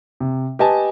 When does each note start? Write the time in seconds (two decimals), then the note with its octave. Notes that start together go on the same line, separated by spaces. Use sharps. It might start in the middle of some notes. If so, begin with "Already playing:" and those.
0.20 C3
0.59 G4 B4 D#5 G#5 A5